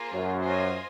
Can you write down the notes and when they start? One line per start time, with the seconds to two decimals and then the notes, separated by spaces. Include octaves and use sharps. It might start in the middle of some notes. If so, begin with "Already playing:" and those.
Already playing: A#3 F4 G#4 C5
0.13 F#2
0.43 F4 C5 D#5 G#5